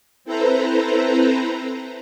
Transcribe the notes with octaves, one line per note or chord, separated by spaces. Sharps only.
C4 E4 A4 B4 C5 A#5